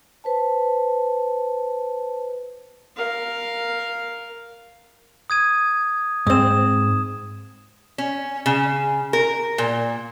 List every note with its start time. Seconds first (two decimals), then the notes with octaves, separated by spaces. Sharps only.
0.24 B4 C5 A5
2.96 A#4 F5
5.30 D#6 G#6 D#7
6.27 G#2 C4 D#6 E7
7.98 C#4
8.46 C#3
9.13 A#4
9.58 A#2